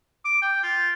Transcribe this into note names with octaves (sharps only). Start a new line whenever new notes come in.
D6
G5
F4